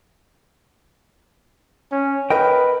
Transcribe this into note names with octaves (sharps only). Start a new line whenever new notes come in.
C#4
A#4 B4 D#5 G5